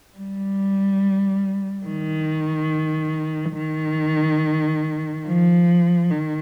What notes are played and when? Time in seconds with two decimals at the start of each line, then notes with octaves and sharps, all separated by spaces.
0.18 G3
1.87 D#3
3.57 D#3
5.27 F3
6.11 D#3